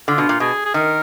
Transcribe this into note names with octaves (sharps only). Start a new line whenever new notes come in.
D3 F4
B2
A#2
B2 G#4
G#4
D#3 A#4